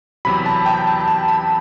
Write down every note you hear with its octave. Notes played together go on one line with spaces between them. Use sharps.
E2 C3 F#3 B5
A5
G5
A5
B5
A5
B5